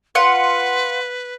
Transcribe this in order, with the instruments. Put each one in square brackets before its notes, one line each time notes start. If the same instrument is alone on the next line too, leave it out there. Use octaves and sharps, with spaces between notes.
[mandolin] F4 F#5 [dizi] B4